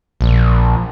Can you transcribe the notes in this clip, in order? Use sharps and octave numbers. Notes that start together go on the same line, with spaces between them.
A#1